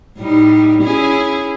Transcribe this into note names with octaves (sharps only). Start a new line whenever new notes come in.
A2 G3 D#4
C#4 E4 G#4